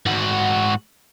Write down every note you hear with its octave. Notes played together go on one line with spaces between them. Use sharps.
G#2 F#4